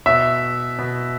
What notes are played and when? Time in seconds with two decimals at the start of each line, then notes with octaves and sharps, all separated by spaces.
0.06 B2 E5
0.79 B2